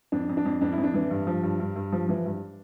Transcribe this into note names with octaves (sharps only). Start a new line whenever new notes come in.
F2 D4
F2
D4
F2
F2 D4
E4
F2
D4
E3
G2
F3
G2
G2
G2
F3
E3
G2